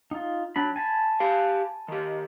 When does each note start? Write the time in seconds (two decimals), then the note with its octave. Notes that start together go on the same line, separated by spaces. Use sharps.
0.11 D#4 F4
0.56 F#3 D4 B5
0.76 G#5 A5 B5
1.20 G4 F5
1.88 D#3 G4